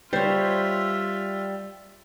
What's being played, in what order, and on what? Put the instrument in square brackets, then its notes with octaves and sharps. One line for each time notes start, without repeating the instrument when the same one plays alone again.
[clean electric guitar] G3 [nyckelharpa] F4 E5 [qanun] C5 C#5